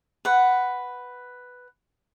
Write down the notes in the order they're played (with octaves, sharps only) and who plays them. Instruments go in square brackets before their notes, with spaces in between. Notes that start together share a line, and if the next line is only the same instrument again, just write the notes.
[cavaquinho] B4 F#5